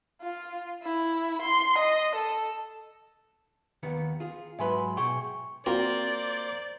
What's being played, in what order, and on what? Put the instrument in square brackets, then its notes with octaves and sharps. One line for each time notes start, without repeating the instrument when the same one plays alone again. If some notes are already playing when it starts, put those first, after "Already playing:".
[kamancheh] F4
E4
C6
D#5
A4
[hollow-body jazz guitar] D#2 D#3 B3
F4 G#4
[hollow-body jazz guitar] G#2 F#3 B4 [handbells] E5 G#5 C6
[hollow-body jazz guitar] B2 G#4 G5 [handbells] C#6
[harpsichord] A#3 [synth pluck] C4 F4 F#4 [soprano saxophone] C5 [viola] D5